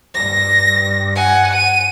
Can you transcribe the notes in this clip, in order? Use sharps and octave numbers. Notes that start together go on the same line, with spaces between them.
G2 A#6
F#5 G#5
D#7